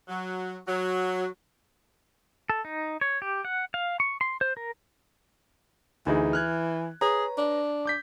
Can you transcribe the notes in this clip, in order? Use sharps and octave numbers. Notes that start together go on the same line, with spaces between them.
F#3
F#3
A4
D#4
C#5
G4
F#5
F5
C#6
C6
C5
A#4
D2 E3 D#4 G#4
F6 F#6 G#6
G#4 B4 C#5 A#5
D4
D6 G6 B6